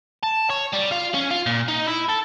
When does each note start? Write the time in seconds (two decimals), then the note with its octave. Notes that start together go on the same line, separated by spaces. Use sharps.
0.23 A5
0.50 C#5
0.73 G3
0.91 F4
1.14 C#4
1.31 F4
1.46 A#2
1.69 D#4
1.87 E4
2.10 A4